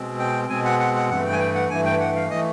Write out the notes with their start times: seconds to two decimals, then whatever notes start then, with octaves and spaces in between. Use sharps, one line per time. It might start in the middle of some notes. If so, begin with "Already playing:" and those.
Already playing: B2 G#3 C4
0.19 G5
0.49 B2 G#3 C4 G#5
0.65 F#5
0.80 F#5
0.95 F#5
1.09 G2 E3 A3 F#5
1.25 G5
1.32 G#5
1.39 G5
1.55 F#5
1.70 G2 E3 A3 G#5
1.85 G5
2.00 F#5
2.16 F5
2.30 E3 A3 D#5